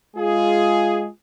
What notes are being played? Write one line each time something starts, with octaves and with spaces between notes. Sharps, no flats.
G#3 F4 G#4